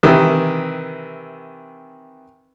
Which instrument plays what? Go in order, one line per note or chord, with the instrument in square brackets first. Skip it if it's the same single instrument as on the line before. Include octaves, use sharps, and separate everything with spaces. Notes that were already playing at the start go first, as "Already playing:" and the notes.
[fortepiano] C3 D#3 E3